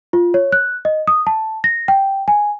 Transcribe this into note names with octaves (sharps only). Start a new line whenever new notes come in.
F4
C#5
F#6
D#5
D#6
A5
A#6
G5
G#5